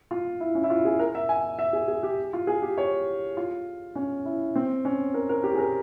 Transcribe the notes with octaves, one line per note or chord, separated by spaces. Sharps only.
F4
E4
C#4
E4
F4
G#4
A#4
E5
G#5
E5
G#4
G#4
G4
F4
G#4
G4
C#5
F4
C#4
E4
C4
C#4
A#4
A#4
G4
G#4
A#4